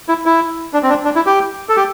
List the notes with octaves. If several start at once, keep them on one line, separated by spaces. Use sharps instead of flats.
E4
E4
D4
C4
D4
D4
E4
G4
A4
G4